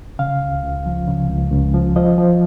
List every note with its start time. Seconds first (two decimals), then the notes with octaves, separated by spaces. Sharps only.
0.19 C#3 F5
0.42 C#2
0.63 C#2
0.86 F3
1.08 C#3
1.30 C#2
1.52 C#2
1.74 F3
1.96 F3 D#5
2.18 F3